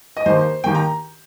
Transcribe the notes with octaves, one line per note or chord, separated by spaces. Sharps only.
D#5
D#2 D#3 A#3 C5
D#2 D#3 A#3 G5
A#5